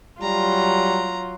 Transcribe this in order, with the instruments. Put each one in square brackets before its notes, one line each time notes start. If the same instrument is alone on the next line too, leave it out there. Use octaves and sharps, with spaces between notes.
[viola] F#3 F4 [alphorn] G3 [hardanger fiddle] A#5